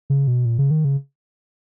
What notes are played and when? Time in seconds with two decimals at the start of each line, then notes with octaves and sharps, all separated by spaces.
0.10 C#3
0.28 B2
0.45 A#2
0.58 C#3
0.71 D#3
0.85 C#3